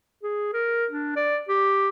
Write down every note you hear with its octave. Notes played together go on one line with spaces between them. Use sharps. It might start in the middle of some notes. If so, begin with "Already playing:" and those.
G#4
A#4
D4
D5
G4